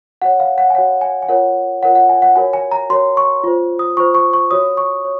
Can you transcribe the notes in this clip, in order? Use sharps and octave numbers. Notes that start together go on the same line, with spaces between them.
F#4 C#5 F#5
F5
F#5
G#5
F#4 C#5 F#5
G#5
G#5
F4 A#4 C#5 F#5
F4 A#4 C#5 F#5
F#5
G#5
F#5
F#4 A#4 C#5 G#5
G#5
A#5
F#4 A#4 C#5 C6
C#6
F4 C5
D#6
F4 C5 C#6
C#6
C#6
F#4 C#5 D#6
C#6
C#5